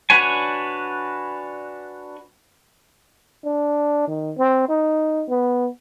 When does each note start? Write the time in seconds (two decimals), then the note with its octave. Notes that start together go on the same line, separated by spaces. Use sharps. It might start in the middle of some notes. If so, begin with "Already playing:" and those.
0.10 D4 F#4 B4 C#5 G#5
3.45 D4
4.08 D#3
4.38 C4
4.69 D#4
5.29 B3